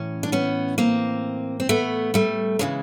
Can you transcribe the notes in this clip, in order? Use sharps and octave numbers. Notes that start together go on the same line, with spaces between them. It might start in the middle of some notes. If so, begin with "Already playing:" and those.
Already playing: A2 E3 C#4
D4
B3 C#4
A#3 C4
C4
A3 B3
G3 A3
C#3 E3 F#3 G#3